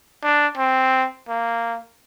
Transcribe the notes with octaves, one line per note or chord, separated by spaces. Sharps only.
D4
C4
A#3